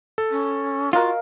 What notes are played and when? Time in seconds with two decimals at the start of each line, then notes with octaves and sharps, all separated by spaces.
0.18 A4
0.31 C#4
0.93 F4 F#4 A#4 D#5 F5